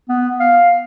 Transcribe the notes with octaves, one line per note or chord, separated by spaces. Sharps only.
B3
F5